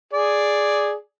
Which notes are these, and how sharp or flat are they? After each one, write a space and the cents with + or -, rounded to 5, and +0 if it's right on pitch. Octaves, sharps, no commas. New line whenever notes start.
G#4 +0 D5 +0